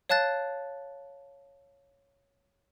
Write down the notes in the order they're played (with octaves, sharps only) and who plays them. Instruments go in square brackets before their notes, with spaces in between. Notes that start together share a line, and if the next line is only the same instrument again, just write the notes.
[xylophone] C#5 F5 A5 F#6 A6